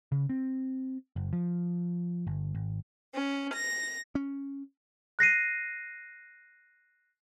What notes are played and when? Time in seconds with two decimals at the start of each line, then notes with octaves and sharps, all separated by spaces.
0.12 C#3
0.29 C4
1.16 F#1
1.33 F3
2.27 G1
2.55 G#1
3.14 C#4
3.53 A#6
4.15 C#4
5.19 F#6 A#6 C7 D#7